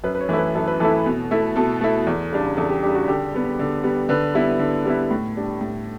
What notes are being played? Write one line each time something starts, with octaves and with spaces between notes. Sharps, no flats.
F#2 B4
B4
C#5
E3 A3 E4
B4
F#2 A4
B4
E3 A3 E4 A4
B2
A3 E4
B2 A4
A3 E4
E2
C#3 G3 D4
E2 A4
G4
C#3 G3 D4 G4
F#4
D3 G4
G3 B3
D3
G3 B3
D3 B4
G3 B3 E4
D3
G3 B3 E4
A2
G3 D4
A2